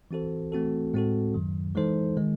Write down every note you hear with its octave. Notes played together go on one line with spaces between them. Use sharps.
E3 C4 F#4 A4 C5
E3 A3 C4 F#4 A4
A2 G#3 C4 F#4 A4
F#2 D#3 F#3
E3 G#3 D#4 A4 C5
D#3 G#3